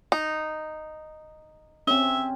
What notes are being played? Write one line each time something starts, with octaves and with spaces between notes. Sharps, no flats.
D#4
C4 C#4 E5